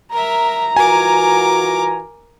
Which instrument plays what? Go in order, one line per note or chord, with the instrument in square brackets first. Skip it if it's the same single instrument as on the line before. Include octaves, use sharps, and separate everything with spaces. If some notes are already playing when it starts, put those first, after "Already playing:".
[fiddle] A#4 E5 [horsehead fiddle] A#5
[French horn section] E3 F4 F#4 [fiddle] A#4 D6 [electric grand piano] G#5